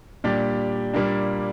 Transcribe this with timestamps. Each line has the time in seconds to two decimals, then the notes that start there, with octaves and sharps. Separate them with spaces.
0.24 A#2 G3 D4 G4 D5
0.94 A#2 G3 A#3 D4